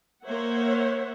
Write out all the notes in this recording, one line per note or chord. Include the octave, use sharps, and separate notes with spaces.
A#3 C5 C#5 E5 F#5